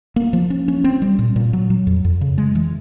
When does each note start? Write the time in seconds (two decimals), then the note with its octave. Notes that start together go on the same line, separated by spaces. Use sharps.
0.16 A#3
0.33 F3
0.50 C#4
0.68 C#4
0.84 C4
1.02 G3
1.19 A#2
1.36 A#2
1.53 F#3
1.70 F#3
1.87 F2
2.05 F2
2.21 C#3
2.38 G#3
2.55 E3